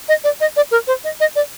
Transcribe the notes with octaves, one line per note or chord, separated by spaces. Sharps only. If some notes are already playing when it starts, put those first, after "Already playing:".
D#5
D5
D#5
D5
A#4
C5
D#5
D#5
D5